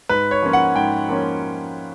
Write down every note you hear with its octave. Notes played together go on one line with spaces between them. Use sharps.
G#2 B4
C#5
F3 A#3 C#4
F#5
G#2 G5
F3 A#3 C#4